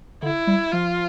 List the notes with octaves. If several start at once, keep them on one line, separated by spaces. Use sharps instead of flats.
D3 E4
G3
F3 F4